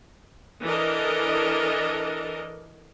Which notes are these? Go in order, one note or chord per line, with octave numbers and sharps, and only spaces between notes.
E3 D4 A4 A#4 D#5